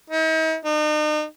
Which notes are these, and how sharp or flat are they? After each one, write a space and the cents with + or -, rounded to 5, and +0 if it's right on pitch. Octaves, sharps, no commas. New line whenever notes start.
D#4 +45
D#4 -40